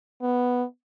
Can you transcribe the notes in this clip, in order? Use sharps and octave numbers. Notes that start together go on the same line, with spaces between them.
B3